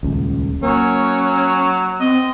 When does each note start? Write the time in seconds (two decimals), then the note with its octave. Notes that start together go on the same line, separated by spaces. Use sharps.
0.03 D#1 C#2
0.62 F#3 A#3 C#4
2.00 C4 D#5